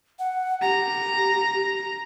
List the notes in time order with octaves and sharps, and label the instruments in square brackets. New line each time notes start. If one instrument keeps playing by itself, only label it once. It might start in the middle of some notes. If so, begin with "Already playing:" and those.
[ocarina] F#5
[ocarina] G4 [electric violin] A#5